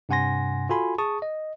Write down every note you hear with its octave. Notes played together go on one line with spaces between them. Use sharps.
G2 C3 F#5 G#5 C6 A#6
F4 F#4 A4 G#5 B5 C6
G#4 A5 C#6 D#6
D#5